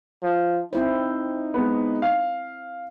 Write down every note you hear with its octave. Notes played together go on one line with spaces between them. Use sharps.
F3
C4 D#4 E4 C5
G#3 B3
F5